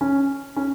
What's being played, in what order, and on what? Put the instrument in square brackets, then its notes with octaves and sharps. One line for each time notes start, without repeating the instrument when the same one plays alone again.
[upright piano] C#4
C#4